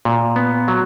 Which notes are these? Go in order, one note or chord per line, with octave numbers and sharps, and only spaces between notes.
A#2
B3
F#3